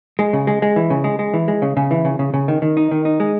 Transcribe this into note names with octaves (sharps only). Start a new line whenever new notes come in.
G#3
C#3
G#3
G#3
E3
C#3
G#3
G#3
E3
G#3
C#3
C#3
E3
C#3
C#3
C#3
D#3
D#3
D#4
D#3
D#4
G#3